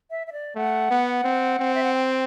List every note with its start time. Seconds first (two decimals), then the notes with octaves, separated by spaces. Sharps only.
0.11 E5
0.27 E5
0.33 D5
0.55 A3 F#5
0.91 B3
1.24 C4
1.59 C4
1.75 E5
1.83 F#5
1.94 G5